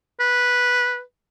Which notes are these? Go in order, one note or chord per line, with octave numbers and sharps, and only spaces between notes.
B4